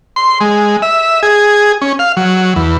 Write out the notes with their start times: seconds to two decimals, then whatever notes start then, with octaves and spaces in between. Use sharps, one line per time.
0.16 C6
0.41 G#3
0.82 E5
1.23 G#4
1.82 C#4
1.99 F5
2.17 F#3
2.56 E2